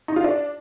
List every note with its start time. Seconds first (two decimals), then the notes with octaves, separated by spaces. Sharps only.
0.08 D#4
0.16 F4
0.24 D4